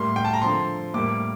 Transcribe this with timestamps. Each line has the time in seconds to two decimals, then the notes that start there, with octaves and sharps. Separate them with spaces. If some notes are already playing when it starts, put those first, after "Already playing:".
Already playing: A2 G3 A#3 C6
0.16 G5
0.25 A5
0.33 A#5
0.41 D3 F3 C4 C6
0.94 A2 G3 A#3 D6